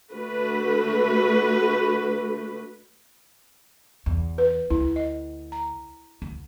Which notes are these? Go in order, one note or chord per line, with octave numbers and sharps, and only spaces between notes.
D3 A3 F#4 B4
E2
B4
D2 E4
D#5
A#5
D2